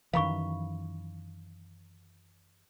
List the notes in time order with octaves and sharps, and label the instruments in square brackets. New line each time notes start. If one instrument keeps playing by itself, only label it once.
[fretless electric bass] F#2 D#3 E3 [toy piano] F5 B5 C#6